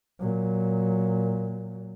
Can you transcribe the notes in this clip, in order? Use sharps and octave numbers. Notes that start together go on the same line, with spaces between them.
A#2 F#3